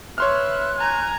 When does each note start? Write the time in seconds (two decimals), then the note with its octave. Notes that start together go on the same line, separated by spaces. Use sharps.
0.18 B4 C#5 E5 C6 F6 F#6
0.79 G#5 A#5 G#6